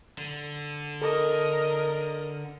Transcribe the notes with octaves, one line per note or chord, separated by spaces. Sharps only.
D3
A4 A#4 D#5